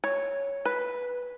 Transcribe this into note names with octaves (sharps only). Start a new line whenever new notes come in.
C#5
B4